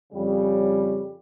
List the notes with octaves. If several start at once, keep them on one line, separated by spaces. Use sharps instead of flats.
F2 C#3 G3